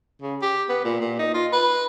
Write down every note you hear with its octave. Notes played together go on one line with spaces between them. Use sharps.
C#3
G4
B3
A#2
A#2
D#4
F4
B4